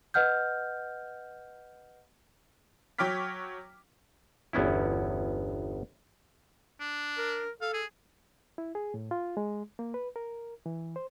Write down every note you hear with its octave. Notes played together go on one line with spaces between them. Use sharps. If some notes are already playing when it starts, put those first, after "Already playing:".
B4 D#5 F#5 F6 G6
F#3 C#5 G5 D6 F6 B6
G1 E2 B3 C#4 E4
D4
A#4
A4 F5
G#4
E4
G#4
A2
F4
G#3
A#3
B4
A#4
E3
C5